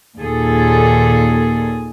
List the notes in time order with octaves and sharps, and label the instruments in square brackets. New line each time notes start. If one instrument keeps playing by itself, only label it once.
[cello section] D#2 A#2 G#4 A4